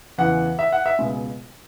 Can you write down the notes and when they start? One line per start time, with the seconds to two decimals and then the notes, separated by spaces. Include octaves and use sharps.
0.18 E2 C#3 E3 F#5
0.59 E5
0.72 F#5
0.86 E5
0.99 C#2 B2 G#3